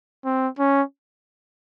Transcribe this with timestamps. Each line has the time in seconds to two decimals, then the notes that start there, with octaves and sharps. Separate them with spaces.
0.25 C4
0.59 C#4